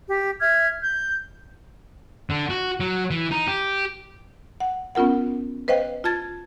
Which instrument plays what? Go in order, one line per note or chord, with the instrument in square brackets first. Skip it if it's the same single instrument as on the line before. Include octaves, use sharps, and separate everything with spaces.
[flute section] G4
E5 F6 G#6
G6
[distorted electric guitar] D3
F#4
F#3
E3
D#4
G4
[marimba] F#5
B3 C#4 F4 A#4 F#5
B4 C5 D#5 F5 G5
F4 A5 G#6 A6